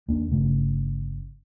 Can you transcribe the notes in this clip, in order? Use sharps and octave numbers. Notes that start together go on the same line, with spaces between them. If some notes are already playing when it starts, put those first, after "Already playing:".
D#2 A#3 D4
G1 C#3 A3